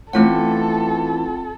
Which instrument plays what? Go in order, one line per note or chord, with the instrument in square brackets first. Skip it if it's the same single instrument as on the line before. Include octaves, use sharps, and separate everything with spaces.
[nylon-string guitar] E3 A3 C#4 [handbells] C4 F4 F#5 [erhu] A4